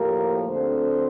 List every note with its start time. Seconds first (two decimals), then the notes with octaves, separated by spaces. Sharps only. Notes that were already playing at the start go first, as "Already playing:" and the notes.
Already playing: A2 F3 A#3 G4 A#4
0.47 D2 D3 A3 C4 A4 C5